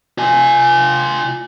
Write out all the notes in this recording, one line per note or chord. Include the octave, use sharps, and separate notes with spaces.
F4 G#5